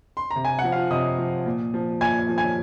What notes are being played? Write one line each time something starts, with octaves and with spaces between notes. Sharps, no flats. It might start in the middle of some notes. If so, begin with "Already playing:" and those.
C6
A#5
C3
G#5
F3 F#5
F4 F5
C3 D#5 D#6
F3
A#2
F3
A#2 G#5 G#6
F3
G#5 G#6